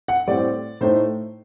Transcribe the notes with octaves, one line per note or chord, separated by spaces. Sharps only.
F#5
A2 G3 C4 D5
A2 A3 D#4 C5